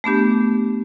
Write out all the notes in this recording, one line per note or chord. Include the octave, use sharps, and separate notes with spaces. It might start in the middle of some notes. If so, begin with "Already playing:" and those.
A3 B3 D4 G4